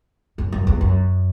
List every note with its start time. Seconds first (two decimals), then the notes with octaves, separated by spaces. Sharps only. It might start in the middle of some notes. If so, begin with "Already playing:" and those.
0.38 F#2
0.52 F#2
0.67 E2
0.81 F#2